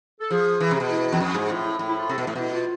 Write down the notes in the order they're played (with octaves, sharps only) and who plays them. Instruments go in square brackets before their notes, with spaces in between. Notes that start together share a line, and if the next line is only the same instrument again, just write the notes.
[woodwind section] A4
[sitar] F3 [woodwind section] G#4
[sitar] E3
C3
B2
[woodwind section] E4
[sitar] E2
[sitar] F2 [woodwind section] G#4
[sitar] G#2 [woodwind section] G#4
[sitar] A2 [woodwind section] F4
[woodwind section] E4
[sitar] A2
[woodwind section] E4
F4
[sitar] C3 [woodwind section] A4
[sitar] B2
A2
[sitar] B2 [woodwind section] E4
[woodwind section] F4